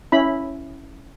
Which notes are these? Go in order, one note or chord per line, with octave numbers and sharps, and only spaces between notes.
C#4 E4 B5